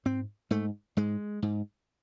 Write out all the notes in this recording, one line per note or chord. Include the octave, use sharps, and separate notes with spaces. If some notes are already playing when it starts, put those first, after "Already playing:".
G#2 C4
G#2 A3
G#2 G#3
G#2